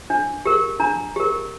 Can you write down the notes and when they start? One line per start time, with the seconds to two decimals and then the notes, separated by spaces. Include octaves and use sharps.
0.10 D4
0.45 G4 A#4
0.80 D4 A#5
1.16 G4 A#4